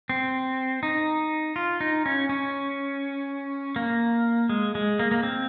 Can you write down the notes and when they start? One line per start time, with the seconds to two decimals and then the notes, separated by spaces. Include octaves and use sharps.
0.09 C4
0.83 D#4
1.56 F4
1.81 D#4
2.06 C#4
2.29 C#4
3.76 A#3
4.49 G#3
4.75 G#3
4.99 A#3
5.11 A#3
5.23 C4